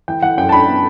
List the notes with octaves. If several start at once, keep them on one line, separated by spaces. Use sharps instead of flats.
E3 G5
E3 F#5
F#2 G5
A5
D4 B5
B3